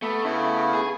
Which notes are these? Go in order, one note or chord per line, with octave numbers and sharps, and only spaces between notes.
A3 B3 E5
C#3 A3 B3 E4
G#4